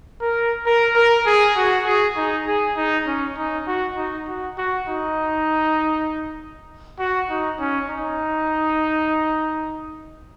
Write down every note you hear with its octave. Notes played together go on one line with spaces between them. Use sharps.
A#4
A#4
A#4
G#4
F#4
G#4
D#4
G#4
D#4
C#4
D#4
F#4
D#4
F#4
F#4
D#4
F#4
D#4
C#4
D#4